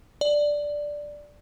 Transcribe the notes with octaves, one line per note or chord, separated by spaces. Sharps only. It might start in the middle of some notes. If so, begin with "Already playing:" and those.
D5